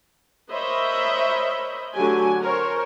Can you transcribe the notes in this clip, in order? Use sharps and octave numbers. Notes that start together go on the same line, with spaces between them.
A#4 C5 C#5 D#5 E5 B5
D3 F#3 A3 F#4 G4 G#5
A#4 C5 C#5